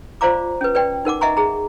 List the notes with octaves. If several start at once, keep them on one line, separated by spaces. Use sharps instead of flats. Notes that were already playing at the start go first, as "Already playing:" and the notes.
F4 C5 D5 F5 A#5 D6
C#4 B4
B4 D5 G5
D#4 A#4 F#5 D6
D#5 E5 F#5 G#5 A#5 C#6
G#4 A#5